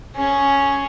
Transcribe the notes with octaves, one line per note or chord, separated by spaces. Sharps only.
C#4 G#4